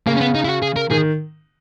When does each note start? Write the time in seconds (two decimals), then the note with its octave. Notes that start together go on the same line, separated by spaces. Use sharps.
0.06 C#3 A#3
0.17 C#4
0.21 B3
0.35 D#4
0.45 E4
0.49 F#4
0.62 G#4
0.76 A#4
0.91 D#3 G#4